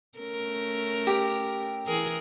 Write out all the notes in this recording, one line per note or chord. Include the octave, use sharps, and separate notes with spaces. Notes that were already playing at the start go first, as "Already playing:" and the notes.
A3 C#4 A#4
G4
E3 G#4 A#4